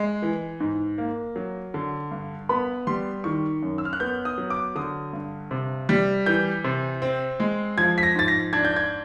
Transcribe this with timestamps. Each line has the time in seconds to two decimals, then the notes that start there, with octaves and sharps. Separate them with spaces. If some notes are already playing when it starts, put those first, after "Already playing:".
Already playing: G#3
0.22 E3
0.60 G#2
0.98 A#3
1.36 F#3
1.74 D3
2.11 G2
2.49 B3 B5
2.87 G3 C6
3.24 D#3 C#6
3.63 F#2
3.78 E6
3.85 F6
3.93 F#6
4.00 B3 G6
4.25 D#6
4.38 F#3
4.50 D6
4.75 D3 D#6
5.13 G2
5.51 C3
5.89 G3
6.26 E3 G6
6.64 C3
7.02 C4
7.40 G#3
7.78 F3 G#6
7.98 B6
8.03 A#6
8.15 G#2 A6
8.28 A#6
8.53 D4 G#6
8.65 G6
8.76 G#6